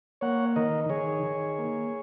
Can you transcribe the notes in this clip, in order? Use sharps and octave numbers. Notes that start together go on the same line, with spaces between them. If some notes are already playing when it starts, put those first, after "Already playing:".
A#3 C#5 F#5
D#3 A#4 D#5
D#3 G#4 C#5
D#3
A#3